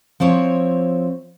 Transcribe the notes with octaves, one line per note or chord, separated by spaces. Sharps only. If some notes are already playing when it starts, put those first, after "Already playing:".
F3 C4 E4 C#5